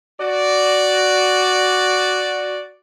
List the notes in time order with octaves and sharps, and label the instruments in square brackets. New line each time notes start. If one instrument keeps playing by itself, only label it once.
[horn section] F#4 D5